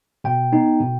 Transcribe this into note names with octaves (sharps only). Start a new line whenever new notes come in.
B2 G5
B3 D#4
B2